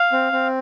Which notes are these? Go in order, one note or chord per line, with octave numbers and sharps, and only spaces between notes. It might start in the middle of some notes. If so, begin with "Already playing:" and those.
Already playing: F5
C4
C4